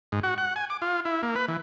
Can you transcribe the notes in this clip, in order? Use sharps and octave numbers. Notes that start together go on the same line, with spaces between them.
G#2
F#4
F#5
G#5
D6
F4
E4
A#3
B4
E3